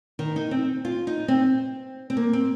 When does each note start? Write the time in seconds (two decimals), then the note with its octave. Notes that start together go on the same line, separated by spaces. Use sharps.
0.19 D#3
0.36 D#4
0.51 C4
0.85 F4
1.07 D#4
1.28 C4
2.10 C4
2.17 A#3
2.33 C4